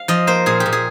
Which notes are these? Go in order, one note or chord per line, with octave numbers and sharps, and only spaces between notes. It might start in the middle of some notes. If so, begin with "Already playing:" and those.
Already playing: F5
F3 D#5
A#3 C5
A#2 G#4
G4
A#2
G#4